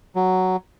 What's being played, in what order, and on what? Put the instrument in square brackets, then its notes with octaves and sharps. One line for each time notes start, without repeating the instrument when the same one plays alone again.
[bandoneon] F#3